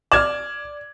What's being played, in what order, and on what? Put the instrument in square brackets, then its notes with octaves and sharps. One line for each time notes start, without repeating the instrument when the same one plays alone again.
[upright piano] D5 [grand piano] F6 G#6 E7